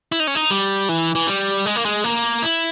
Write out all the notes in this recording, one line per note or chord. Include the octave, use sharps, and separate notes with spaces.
E4
D#4
C#4
D#4
G3
E3
E3
G3
G#3
A#3
G#3
A#3
E4